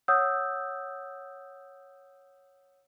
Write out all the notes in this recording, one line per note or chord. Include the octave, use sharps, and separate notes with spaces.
C#5 F#5 D#6 E6 G6